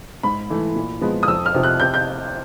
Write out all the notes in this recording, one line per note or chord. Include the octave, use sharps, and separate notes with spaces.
G#2 B5
E3 A3
A#2
F3 G#3 B3
D#6
F2 E6
F6
C3 F3
F#6
C3 G6
G6